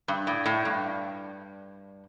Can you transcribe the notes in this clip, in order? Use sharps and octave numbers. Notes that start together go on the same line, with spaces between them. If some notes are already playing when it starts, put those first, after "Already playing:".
G2
A2
A2
G2